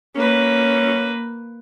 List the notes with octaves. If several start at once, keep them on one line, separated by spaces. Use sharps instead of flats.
A#3 C#4 B4